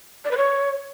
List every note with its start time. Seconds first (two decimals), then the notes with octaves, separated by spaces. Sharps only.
0.25 D5
0.31 B4
0.37 C#5